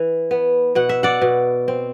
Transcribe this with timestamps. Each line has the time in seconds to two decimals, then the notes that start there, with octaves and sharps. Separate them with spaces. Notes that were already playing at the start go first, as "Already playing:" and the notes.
Already playing: E3
0.31 B3
0.75 B2 F#5
0.89 E5
1.03 D5 F#5
1.21 B2
1.68 C4